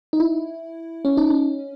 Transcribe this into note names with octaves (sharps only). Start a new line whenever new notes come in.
D#4
E4
C#4
D#4
C#4